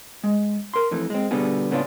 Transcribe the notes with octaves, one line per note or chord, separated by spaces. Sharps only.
G#3
A#4 C6
F2 E3 A3
G#3 C4
B2 D3 G3 B3 G#4
A2 C#3 B3 C#4 D4 F4